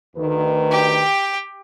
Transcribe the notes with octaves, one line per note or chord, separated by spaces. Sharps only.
D2 D#3 B4
G4 G5